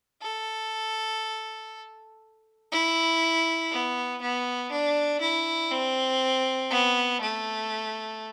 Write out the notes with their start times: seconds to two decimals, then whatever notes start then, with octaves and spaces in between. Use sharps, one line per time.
0.22 A4
2.71 E4
3.71 B3
4.22 B3
4.71 D4
5.21 E4
5.71 C4
6.71 B3
7.21 A3